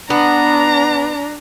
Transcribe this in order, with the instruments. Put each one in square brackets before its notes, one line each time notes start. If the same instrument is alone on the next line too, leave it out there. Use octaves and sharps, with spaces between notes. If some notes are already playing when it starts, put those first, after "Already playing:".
[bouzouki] B3 [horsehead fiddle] D4 [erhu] A#5